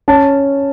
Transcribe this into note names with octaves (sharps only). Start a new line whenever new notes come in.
C#4 A5